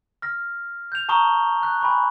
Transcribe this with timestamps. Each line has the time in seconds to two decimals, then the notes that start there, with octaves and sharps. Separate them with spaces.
0.22 F6 A#6
0.92 G6 F7
1.09 A5 A#5 C#6 D#6 G7
1.62 C#6 F#6
1.81 G#5 B5 C#6